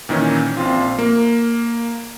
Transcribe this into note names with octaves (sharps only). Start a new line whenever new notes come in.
A#2 D#3 E3 C#4
A#1 C4 F4
A#3